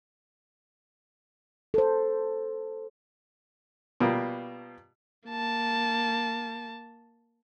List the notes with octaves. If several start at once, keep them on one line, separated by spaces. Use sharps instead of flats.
A4 C5
B2 F3 G3 A#3
A#3 A5